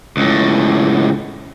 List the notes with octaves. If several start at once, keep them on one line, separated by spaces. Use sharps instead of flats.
C#2 A2